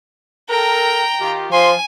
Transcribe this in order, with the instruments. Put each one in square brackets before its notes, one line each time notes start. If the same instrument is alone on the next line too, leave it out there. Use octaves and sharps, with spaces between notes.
[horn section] A4 A#4 [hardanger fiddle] G5 A#5
[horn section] D#3 F4 G4
[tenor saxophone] F3 [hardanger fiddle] G#5 [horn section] C6